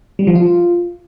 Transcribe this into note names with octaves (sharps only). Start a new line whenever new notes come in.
G3
F3
F4